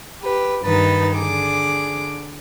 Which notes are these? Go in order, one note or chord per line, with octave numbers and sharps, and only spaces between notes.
G4 B4
G2 D#3 D#4 B4 A6
D3 G#4 D6